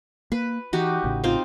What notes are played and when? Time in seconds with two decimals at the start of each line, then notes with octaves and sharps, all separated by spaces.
0.32 A#3 B4
0.73 E3 D#4 F#4 G4
1.04 A1 A2 C#3
1.24 C4 D#4 F4